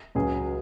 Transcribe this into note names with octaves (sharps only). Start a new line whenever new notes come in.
C#2 C#3 F#3 G#4